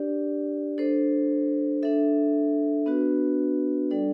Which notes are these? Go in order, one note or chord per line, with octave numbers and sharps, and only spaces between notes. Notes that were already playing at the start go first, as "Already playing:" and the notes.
Already playing: D4 G4 D5
D4 A4 C5
D4 A4 E5
B3 D4 F#4 B4
G3 D4 A4 D5